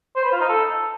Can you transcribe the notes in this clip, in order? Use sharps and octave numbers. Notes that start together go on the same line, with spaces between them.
C5
B4
F4
D#4
A4